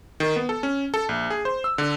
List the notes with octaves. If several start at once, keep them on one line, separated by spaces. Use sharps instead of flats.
D#3
B3
A4
C#4
A4
A#1
G#4
C5
E6
D3